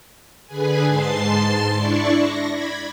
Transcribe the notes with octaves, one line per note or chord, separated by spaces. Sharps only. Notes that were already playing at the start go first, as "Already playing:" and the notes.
D3 G#4 B4 G#5
G#2 A5 C6 A6 C7
D4 E4 D5 C#6
A#6
B5 G#6